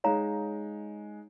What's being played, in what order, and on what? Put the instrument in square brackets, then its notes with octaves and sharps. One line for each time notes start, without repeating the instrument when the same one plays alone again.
[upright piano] G#3 D#4 [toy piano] C#5 F5 A#5